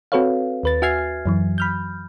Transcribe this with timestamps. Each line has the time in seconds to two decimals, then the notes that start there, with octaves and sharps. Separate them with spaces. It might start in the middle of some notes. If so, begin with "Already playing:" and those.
0.12 C4 F#4 A4 B4 C#5 F5
0.63 D#2 B4 A6
0.82 F#4 E5 G#5 F6 G#6 C7
1.26 F#2 E3 F#3
1.58 B5 F6 G6